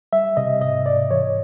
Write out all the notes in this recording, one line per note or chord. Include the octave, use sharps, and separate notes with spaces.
G3 E5
C3 D#5
G#2 D#5
G#2 D5
E3 C#5